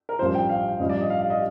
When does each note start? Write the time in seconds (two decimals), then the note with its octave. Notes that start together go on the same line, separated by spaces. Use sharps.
0.09 A#4
0.19 A1 G2 F3 C5
0.34 G5
0.49 F5
0.80 A1 G2 F3 D#5
0.89 D5
1.01 D#5
1.10 F5
1.21 F5
1.30 D#5